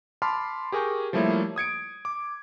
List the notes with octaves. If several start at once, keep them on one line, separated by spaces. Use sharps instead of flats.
A5 B5 C6 D6 F6
G4 G#4 A#4 G#5 C#6 G6
F3 G3 A3 A#3 E4 C#5
D#6 G#6 C#7 D7
D6